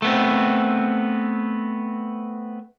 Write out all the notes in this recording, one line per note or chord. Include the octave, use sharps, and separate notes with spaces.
A3 B3 C4